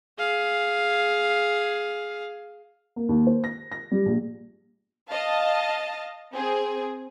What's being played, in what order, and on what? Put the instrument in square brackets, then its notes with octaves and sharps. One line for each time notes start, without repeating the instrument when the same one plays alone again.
[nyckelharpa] G#4 F5
[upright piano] A#3
D#2
C5
A#6
A#6
G3
A#1
[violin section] D#5 F5 A5
C4 G#4